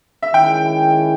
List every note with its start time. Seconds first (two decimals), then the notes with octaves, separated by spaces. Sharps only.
0.22 E5
0.34 D#3 G#3 C#4 E4 G5